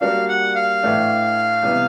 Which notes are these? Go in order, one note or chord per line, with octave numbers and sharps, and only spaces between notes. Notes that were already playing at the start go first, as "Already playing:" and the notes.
G3 A#3 D4 F#4 F5
F#5
F5
A2 E3 A3 D4
C3 E3 G3 B3